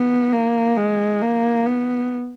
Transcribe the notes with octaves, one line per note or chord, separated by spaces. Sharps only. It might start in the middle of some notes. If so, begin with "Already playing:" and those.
Already playing: B3
A#3
G#3
A#3
B3